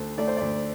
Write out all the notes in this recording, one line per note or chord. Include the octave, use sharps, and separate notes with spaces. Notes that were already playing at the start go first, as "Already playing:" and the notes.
Already playing: D2 A3 C5
A3 D5
C5
D2 D5